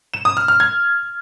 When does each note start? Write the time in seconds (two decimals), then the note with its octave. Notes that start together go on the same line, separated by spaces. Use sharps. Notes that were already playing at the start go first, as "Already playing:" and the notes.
0.14 E7
0.25 D#6
0.37 F6
0.48 F6
0.60 G#6